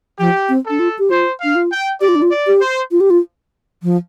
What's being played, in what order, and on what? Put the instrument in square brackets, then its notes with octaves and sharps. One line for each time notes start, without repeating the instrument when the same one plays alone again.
[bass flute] F3 [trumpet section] G4
[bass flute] C4
[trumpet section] A4
[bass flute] D4
F4
G4
[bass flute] F4 [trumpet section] C5
[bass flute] D4 [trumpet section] F5
[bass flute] F4
[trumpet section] G5
[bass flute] G4 [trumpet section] D5
[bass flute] F4
D4
F4
[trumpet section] D5
[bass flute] G4
[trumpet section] C5
[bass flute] F4
G4
F4
F3